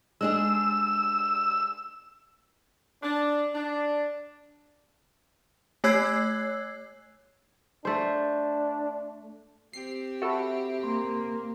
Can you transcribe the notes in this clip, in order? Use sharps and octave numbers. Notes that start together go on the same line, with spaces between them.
G#3 D4 G#4 E6
D4
D4
A3 C#5 E6 F#6 G#6 C7
A3 D4 C5
C4 G4 C7
F#4 A4 E5 B5
A#3 C6